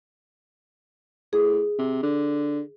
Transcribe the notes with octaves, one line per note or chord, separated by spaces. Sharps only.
A2 G#4
C3
D3